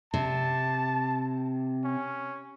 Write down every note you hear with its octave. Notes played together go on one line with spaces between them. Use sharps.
C3 A5
C#4